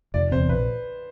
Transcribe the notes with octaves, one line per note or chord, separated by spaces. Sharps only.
F1 D5
E2 C3 C5
A#1 B4